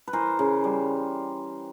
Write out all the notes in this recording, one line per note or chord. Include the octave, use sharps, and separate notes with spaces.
B4
E3 A#4 C5
C#3
G3